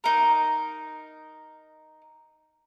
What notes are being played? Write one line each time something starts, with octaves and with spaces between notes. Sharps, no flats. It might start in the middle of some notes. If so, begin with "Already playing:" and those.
D#4 A#4